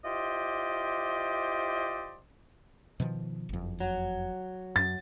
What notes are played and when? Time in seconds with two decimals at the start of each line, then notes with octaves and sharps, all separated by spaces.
0.04 E4 F4 G4 C5 D5 D#5
3.00 B2 D#3 F3
3.49 F#1 F2
3.80 F#3
4.76 F#2 A6